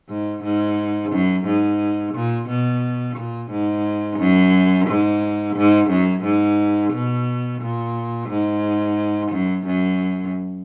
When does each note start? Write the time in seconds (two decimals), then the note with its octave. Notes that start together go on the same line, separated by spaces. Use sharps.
0.09 G#2
0.43 G#2
1.12 F#2
1.46 G#2
2.14 A#2
2.49 B2
3.17 A#2
3.51 G#2
4.20 F#2
4.88 G#2
5.56 G#2
5.90 F#2
6.24 G#2
6.93 B2
7.61 A#2
8.29 G#2
9.32 F#2
9.66 F#2